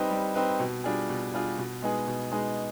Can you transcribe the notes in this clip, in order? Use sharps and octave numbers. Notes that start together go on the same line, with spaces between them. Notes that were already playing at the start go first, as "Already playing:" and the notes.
Already playing: G3 C4 D#4 B4
G3
C4 D#4 B4
B2
G3 D4 F4 G#4
B2
G3 D4 F4 G#4
B2
G#3 B3 D#4 G#4
B2
G#3 B3 D#4 G#4